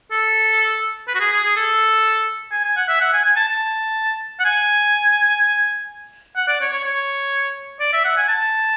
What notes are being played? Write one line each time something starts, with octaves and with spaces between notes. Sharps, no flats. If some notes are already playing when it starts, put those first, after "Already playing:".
A4
B4
F#4
G#4
G#4
G#4
A4
G#5
G#5
F#5
E5
F#5
G#5
G#5
A5
A5
F#5
G#5
F#5
D5
C#5
C#5
C#5
D5
E5
F#5
G#5
A5